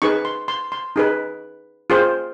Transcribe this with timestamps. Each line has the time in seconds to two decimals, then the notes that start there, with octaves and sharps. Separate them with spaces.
0.02 D#4 G#4 B4 C#6
0.25 C6
0.48 C6
0.72 C6
0.96 D#4 G#4 B4
1.90 F4 G#4 C5